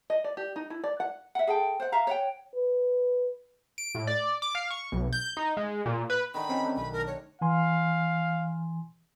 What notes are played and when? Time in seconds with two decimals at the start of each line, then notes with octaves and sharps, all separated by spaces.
0.10 D#5
0.24 D5
0.37 G4
0.56 D#4
0.70 E4
0.84 D5
1.00 F#5
1.35 E5 F#5
1.47 G#4 A4 G5
1.80 C5 F#5
1.92 E5 F5 A#5
2.07 C#5 F#5 G5
2.56 B4
3.78 D7
3.95 A2
4.07 D5
4.42 D6
4.55 F5
4.70 C#6
4.92 B1
5.13 G6
5.37 D#4
5.57 G#3
5.86 A#2
6.10 B4
6.34 D3 D#3 B5
6.49 C4 C#4 D#4 G4 G#5
6.64 A3 D4
6.77 B1 D#3 B5
6.93 A#4
7.07 C#5
7.41 E3 F5 G#5 C6